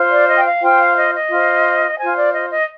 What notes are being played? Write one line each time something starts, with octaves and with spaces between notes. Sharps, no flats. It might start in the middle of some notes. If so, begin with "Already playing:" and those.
Already playing: F4 C5
D5
D#5
G5
F5
F4 C5 G5
F5
D#5
D#5
F4 C5
F4 C5 G#5
D5
D#5
D#5